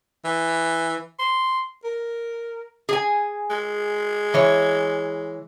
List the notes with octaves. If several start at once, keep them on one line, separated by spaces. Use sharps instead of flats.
E3
C6
A#4
G#4 G#5
G#3
E3 C#5